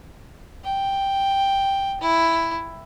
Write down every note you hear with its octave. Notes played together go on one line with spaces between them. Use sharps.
G5
E4